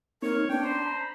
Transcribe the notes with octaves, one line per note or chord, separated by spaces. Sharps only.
A#3 C4 D#4 A#4 C#5
B3 C#4 D4 G5
C5 A#5 B5